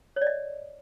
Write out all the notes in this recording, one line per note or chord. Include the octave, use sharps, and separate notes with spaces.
C#5
D5
D#5